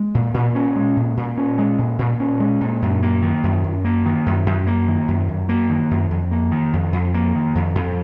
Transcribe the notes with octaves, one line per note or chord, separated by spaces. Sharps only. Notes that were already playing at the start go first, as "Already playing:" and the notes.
Already playing: G#3
A#2
A#2
C#4
G#3
A#2
A#2
C#4
G#3
A#2
A#2
C#4
G#3
A#2
F#2
A#3
D#3
F#2
F#2
A#3
D#3
F#2
F#2
A#3
D#3
F#2
F#2
A#3
D#3
F#2
F2
A#3
D#3
F2
F2
A#3
D#3
F2
F2